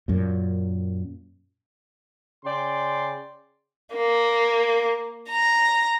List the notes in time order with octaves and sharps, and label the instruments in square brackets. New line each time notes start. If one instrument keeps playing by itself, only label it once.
[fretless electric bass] F#2 A#2
[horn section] C#3 D5 G5 C6
[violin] A#3
A#5